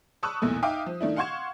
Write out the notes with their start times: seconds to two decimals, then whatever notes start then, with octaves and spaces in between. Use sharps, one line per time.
0.23 A5 B5 C#6 D#6 E6 F#6
0.42 B1 E2 A#2 A3
0.62 D#4 E5 F5 G5 D6 D#6
0.86 F3
1.01 D#3 A3 D4 E4
1.16 F5 F#5 C6 C#6 G#6 E7